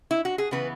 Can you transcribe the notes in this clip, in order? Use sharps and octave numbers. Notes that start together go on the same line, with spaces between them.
E4
F#4
G#4
C#3 E3 B3 B4